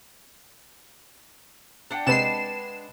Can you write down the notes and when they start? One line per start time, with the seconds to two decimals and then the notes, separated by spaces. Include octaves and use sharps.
1.91 D4 F#5 G5
2.07 C3 G#3 B4 A5 C7 E7